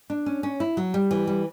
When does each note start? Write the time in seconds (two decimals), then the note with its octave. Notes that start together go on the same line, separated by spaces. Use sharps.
0.10 D4
0.26 C#4
0.43 C#4
0.60 E4
0.77 F#3
0.94 G3
1.11 E3
1.27 G3